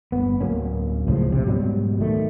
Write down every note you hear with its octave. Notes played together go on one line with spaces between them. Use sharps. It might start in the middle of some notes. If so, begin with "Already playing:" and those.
G1 B3
D1 F#3 A#3 C#4
C#2 A2 C#3 F3
A#1 C3
G#2 B2 F#3 G3
D#3 A3